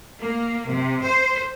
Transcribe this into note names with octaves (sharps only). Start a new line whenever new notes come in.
A#3
C3
C5